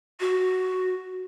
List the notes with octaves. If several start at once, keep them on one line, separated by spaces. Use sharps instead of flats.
F#4